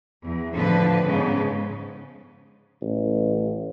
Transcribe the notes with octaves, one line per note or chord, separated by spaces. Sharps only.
E2
A2 D3 F3 B4
G#2 C#3 G#3 B3
A1